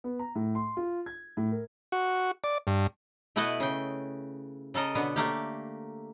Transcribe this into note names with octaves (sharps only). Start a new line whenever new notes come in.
B3
A#5
A2
C6
F4
G#6
A2
A#4
F#4
D5
G2
B2 A3 E4 B4 D#5 F#5
C#3 G5
C#3 A4 A#4 D#5
B2 D3 B3
A3 A#3 G4